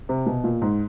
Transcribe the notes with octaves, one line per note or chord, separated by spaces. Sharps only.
C3
B2
A#2
G#2